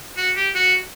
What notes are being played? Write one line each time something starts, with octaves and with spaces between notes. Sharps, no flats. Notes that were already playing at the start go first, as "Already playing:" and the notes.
F#4
G4
F#4